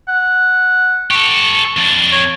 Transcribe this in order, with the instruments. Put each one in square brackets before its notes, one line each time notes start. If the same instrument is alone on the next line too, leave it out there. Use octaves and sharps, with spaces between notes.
[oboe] F#5
[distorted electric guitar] G4 A4 [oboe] C#6
[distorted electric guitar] F2 D4
[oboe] C#5